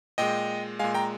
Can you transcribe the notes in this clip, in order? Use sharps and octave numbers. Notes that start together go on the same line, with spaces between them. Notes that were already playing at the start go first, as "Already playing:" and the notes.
A#2 G#3 D#5 G5
A#2 G#3 F5 G#5
G5 A#5